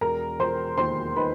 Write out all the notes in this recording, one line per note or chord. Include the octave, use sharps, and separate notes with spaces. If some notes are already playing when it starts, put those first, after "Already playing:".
E1 A#4 A#5
E1 C5 C6
D#2 C5 C6
D#3 B4 B5